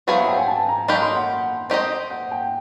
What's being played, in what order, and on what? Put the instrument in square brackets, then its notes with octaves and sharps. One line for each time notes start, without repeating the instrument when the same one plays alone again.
[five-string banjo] F#3 B3 E4 G#4 C5 [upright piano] F5
[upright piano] F#5
G5
G#5
A5
A#5
[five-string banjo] F#3 A#3 D#4 G4 [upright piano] B5
[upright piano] C6
F#5
[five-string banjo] C4 D#4 G4 C5 D#5
[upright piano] F#5
G5